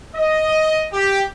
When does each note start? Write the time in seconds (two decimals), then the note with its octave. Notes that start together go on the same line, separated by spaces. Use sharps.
0.15 D#5
0.93 G4